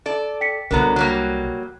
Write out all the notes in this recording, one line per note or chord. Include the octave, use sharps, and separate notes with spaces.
A4 D5
G5 B6 C#7
C2 D3 F#3 B3 A#4 A#5
F#3 G3 A#3 F#6